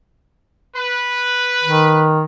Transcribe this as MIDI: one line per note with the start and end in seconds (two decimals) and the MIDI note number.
0.76 2.18 71
1.64 2.23 51